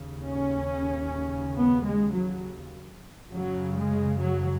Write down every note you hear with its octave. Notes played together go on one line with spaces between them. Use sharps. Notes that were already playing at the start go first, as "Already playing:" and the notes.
Already playing: D#2 C#3
C#4
B3
G#3
F#3
F#2 C#3 F#3
G#3
F#3